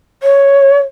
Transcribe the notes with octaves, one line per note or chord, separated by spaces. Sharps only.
C#5